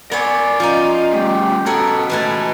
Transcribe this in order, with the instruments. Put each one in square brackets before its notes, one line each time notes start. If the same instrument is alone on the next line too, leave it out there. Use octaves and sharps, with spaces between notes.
[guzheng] B3 C#5 [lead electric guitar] A#4 G#5 [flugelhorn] D5
[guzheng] F3 C#4 D#4 [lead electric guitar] F4
[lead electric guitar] G3 A3 [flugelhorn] G4
[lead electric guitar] F#4 D#5 [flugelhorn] A4 [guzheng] A#4 C#5 F#5
[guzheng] E3 G#3 A3 [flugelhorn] B4